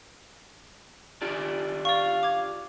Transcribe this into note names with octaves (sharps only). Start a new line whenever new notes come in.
D4 F4 G4
D5 F5 C#6
D6 G#6